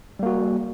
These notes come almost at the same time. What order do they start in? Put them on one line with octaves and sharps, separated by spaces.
G3 A#3 F#4